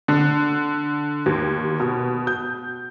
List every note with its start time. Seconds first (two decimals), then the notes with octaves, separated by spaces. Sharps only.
0.08 D3
1.26 D#2
1.80 B2
2.27 G6